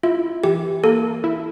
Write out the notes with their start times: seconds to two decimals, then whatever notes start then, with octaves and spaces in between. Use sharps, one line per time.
0.03 E4 F4
0.44 E3 G4
0.84 A#3 A4
1.24 E4